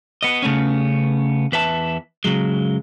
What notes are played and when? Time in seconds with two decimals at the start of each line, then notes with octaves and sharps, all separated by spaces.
0.23 B3 D#5
0.42 C#3 A3 B3 C#4
1.52 E2 B4 E5 A5
2.25 C#3 F#3 G#3